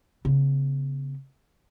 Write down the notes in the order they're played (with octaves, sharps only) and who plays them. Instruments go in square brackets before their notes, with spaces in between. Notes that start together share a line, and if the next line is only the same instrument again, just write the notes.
[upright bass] C#3 B3